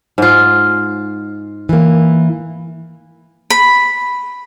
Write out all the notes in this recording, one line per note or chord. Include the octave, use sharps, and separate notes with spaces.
G#2 F4
E3 A#3
B5